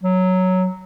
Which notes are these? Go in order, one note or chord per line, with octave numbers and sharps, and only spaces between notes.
F#3